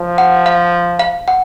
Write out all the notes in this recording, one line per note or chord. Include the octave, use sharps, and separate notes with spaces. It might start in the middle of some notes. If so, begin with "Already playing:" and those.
Already playing: F3
F#5
F5
F5
F#5